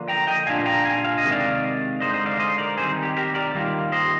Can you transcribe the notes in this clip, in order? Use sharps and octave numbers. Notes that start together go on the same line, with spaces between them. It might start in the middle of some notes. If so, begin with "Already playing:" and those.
Already playing: D3 F3 A#3 D4 F4
G5 A#5
D#5 G5
A#2 G3 D4 F4 F5 G#5
G5 A#5
F5 G#5
F5
D#5
C3 D#3 G#3
D5 F5
D3 G#3 D#4 C5 D#5
C5 D#5
D5 F5
C5 D#5
A#4 D5
D#3 G3 C4 D#4 G#4 C5
G4
G4 A#4
A#4 D5
D#3 G3 A#3 F4
C5 D#5